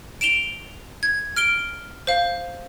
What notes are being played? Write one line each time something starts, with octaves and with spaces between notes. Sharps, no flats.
D7 E7 F7 G7
G#6
F6 D7 G7
C5 F5